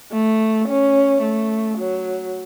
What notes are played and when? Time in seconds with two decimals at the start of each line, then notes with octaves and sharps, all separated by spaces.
0.12 A3
0.68 C#4
1.22 A3
1.78 F#3